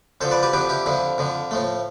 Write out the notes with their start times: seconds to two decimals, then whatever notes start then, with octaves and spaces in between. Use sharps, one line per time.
0.21 F2 D3 F3 A4 C5
0.31 B4 D5
0.43 G4 B4
0.53 F2 D3 F3 G4 B4
0.69 E4 G4
0.86 F2 D3 F3 E4
1.18 F2 D3 F3
1.51 A2 F3 A3